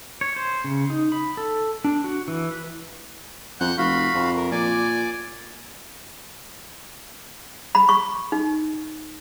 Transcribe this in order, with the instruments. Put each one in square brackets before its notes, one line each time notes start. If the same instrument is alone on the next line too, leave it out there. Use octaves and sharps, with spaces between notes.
[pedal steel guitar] C#5
C5
C#3
D#4
B5
A4
D4
F#4
E3
B4
[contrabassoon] F2 [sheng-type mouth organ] F#5 F#6 G6
[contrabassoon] F1 [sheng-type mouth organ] F#4 F5 B5
[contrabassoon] F2
[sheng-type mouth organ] A#4
[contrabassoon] A#2 [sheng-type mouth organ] D5 G#5 D6
[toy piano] B5
C#6
D#4